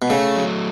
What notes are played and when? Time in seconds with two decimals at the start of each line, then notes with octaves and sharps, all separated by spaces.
0.02 B2
0.10 C#3 A3
0.36 F#3